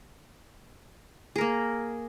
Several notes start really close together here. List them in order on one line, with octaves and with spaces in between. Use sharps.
G#4 A#4 A#3